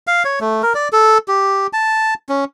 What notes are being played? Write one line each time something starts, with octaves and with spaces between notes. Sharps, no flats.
F5
C#5
A3
A#4
D5
A4
G4
A5
C#4